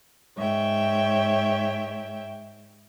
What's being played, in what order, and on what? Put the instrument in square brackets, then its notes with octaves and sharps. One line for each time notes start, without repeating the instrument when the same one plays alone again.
[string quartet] G#2 C#5 E5 G5